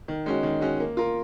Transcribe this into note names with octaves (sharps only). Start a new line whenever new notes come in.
D#3
G#3 C#4 F#4
D#3
G#3 C#4 F#4
A#3
F4 A#4